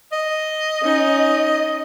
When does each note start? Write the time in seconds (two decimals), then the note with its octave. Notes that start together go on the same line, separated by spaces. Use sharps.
0.12 D#5
0.82 C#4 D#4